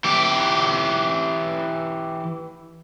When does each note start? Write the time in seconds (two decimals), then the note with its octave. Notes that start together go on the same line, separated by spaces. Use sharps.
0.04 E3 G4